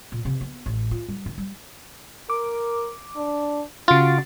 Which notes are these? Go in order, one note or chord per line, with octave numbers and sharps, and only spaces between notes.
A#2
C3
B3
A1
F4
G3
D#3
G3
A#4 D6
D4
C#3 F4 F#4 A6